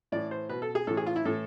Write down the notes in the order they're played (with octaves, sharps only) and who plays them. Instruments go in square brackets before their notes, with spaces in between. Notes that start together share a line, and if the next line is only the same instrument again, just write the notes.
[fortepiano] A2 E3 D5
C5
B2 B4
A4
G#4
A2 E3 A4
G#4
F4
E4
A2 E3 A4